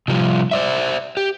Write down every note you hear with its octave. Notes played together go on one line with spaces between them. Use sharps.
C3 F3 G3
C5 D5 E5
G4